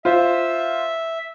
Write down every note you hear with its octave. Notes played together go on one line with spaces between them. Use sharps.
F4 C5 E5